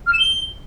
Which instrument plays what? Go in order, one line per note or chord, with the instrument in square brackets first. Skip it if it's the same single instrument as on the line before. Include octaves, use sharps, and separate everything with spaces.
[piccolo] F6
E7
G7